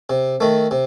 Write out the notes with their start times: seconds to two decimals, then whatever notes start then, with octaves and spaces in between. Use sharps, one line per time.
0.10 C3
0.41 D#3 A3
0.71 C3